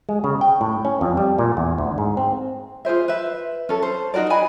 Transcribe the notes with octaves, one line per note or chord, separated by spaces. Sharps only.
G#3
C#3
G5
A2
C#4
F2
G3
A#2
E2
D2
G#2
C4
F4 G#4 C5 E5
B4 E5
C#4 A4
C5
D#4 F#4 A#4 D5
D#5 G#5 B5